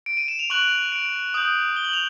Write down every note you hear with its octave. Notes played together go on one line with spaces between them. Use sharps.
D7
D#7
E7
F7
C#6 F#6 F#7
D7
D#6 G6 F#7
G7
F#7
F7